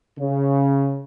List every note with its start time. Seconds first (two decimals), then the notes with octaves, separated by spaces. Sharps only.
0.18 C#3